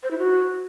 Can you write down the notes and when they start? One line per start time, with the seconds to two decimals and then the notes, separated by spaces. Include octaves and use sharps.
0.03 C5
0.11 E4
0.18 F#4